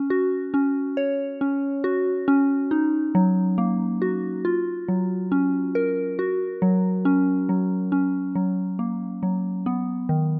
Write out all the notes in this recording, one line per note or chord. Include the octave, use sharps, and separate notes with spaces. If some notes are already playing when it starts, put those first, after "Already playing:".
Already playing: C#4
F#4
C#4
C#5
C#4
F#4
C#4
D#4
F#3
A#3
F#4
F4
F#3
C#4
A#4
F#4
F#3
C#4
F#3
C#4
F#3
A#3
F#3
B3
D#3